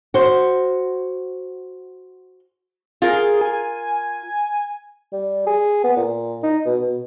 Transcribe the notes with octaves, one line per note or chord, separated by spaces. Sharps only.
F#4 C5
F4 G#4 A#4
G#5
G3
G#4
B3
A#2
D#4
B2
B2